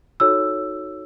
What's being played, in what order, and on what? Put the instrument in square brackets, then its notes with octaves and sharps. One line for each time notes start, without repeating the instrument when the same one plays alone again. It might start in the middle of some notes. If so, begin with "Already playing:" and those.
[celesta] D#4 F#4 A4 C#5 E6